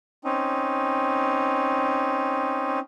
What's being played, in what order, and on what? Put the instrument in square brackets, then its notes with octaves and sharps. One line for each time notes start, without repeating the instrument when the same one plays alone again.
[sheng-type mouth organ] C4 C#4 D#4